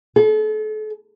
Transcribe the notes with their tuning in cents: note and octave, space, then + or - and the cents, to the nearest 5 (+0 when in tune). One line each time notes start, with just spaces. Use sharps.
A4 -40